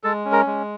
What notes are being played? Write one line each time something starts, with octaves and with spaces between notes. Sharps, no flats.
G#3 A4 A5
C#4
A#4 A#5
G#3